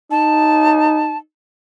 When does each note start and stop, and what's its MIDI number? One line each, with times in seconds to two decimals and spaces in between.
0.11 1.19 63
0.11 1.17 81